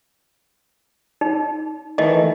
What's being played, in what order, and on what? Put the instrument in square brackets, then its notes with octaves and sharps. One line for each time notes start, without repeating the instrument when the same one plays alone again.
[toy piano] D#4
[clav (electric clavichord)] D#3 E3 A3 [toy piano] D#5